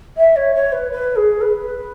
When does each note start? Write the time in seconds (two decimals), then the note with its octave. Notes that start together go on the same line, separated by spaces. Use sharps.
0.17 E5
0.36 C#5
0.55 C#5
0.72 B4
0.92 B4
1.16 G#4
1.41 B4